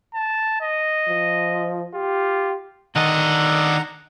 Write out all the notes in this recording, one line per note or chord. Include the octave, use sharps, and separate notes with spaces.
A5
D#5
F3
F4 G4
D3 D#3 D#5 F#5 A5 A#5